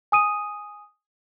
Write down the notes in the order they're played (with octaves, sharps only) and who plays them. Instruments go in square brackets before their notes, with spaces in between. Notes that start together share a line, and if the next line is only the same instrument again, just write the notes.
[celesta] G#5 D#6 D#7